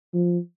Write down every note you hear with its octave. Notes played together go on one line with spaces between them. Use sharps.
F3